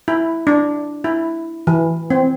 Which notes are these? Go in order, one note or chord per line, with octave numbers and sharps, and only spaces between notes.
E4
D4
E4
E3
C4